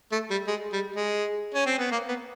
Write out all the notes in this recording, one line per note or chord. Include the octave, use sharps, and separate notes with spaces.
A3
G3
G#3
G3
G#3
C#4
C4
B3
A#3
B3